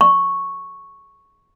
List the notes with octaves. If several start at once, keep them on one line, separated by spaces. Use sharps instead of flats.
C#6